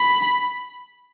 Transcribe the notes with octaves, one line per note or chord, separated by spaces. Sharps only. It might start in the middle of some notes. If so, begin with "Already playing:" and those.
Already playing: B5